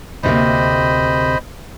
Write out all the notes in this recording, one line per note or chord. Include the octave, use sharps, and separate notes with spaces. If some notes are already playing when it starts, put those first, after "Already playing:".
D2 C3 A#3 C5 D#5 B5